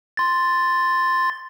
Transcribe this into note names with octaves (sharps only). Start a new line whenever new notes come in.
C6 A6